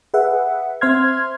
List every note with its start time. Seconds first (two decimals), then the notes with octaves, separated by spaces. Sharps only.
0.14 G#4 B4 E5 F#5
0.81 C4 C5 E5 C6 F6 G#6